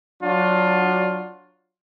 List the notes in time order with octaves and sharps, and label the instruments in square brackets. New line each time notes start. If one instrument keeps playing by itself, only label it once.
[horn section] F#3 D4 F4 F#4